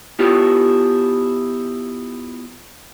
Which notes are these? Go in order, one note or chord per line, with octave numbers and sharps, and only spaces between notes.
B3 E4 F4 G4 C#5